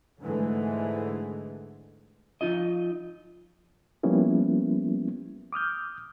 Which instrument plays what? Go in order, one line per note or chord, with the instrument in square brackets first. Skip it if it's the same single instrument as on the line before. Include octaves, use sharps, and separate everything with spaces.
[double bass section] G#2 D3 E3 G#3 A3
[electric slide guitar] F3 D#4 F4 D#5
[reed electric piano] F3 G3 A#3 B3 C#4 E4
D6 D#6 F6 G6